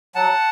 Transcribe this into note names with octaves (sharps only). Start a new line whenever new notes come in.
F#3 F#5 A5